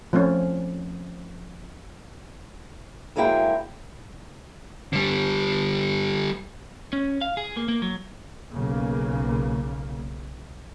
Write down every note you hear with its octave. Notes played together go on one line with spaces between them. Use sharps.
F3 A3 C4 C#4
D2 F#3 G#3 A#3 E4 G5
D3 G3
C#4
F5
G#4
A#3
A#3
F#3
B1 C#3 A#3